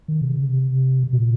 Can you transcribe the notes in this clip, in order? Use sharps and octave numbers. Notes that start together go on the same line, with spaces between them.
D#3
C3
C#3
C3
C3
A#2